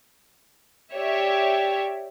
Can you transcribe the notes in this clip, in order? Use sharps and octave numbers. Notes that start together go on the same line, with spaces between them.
G4 C#5 D5 E5